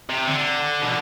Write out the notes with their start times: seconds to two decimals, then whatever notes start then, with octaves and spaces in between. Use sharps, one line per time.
0.09 C3
0.27 D3
0.82 B2